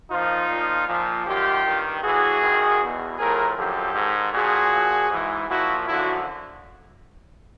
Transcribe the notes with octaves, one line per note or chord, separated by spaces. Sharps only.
A#2 F3 D#4 F4
A#2
F3
A#2 F3
F#2 D#3 F4 G4
G2 D#3
A2 E3 F#4 G#4
F#2 D#3
E2 B2
A2 F3 G#4 A#4
F#2 D3 F3 G4 A4
G#2 D#3
A#2 F3 F#4 G#4
A#2 F3
G#2 E3
A#2 F3 E4 F#4
F#2 D3 F3 E4 F#4